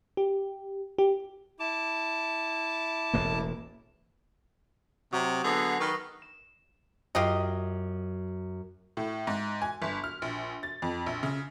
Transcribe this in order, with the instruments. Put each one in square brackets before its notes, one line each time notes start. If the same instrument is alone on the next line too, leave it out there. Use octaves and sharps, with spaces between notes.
[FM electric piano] G4
G4
[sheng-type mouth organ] E4 D6 [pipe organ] A5
[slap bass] E1 A1 A#3
[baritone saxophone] C3 [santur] F#3 [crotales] D#6
[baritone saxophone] D3 [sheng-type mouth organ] B3 G#4 [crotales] E6 A#6 C7
[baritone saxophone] D#3 [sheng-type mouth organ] B4 [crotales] C#6 F6 A#6
[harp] E7
[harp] F#2 [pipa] F4 G4 D#5
[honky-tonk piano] A2
G#2
G#5
G1
F6
A#1
A6
F2
A#1
C#3